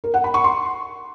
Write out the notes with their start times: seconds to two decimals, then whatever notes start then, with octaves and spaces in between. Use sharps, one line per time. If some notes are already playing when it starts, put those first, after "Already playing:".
0.04 A#4
0.14 F#5
0.24 B5
0.34 C#6
0.44 C6